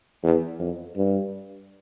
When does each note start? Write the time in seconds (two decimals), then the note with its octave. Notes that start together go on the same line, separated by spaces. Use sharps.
0.24 E2
0.59 F2
0.96 G2